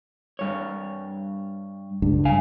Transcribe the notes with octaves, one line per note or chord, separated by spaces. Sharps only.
G2 C#5
C#2 G2
F5 G#5